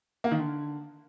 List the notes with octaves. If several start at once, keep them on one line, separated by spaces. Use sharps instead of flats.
A#3
D#3
D3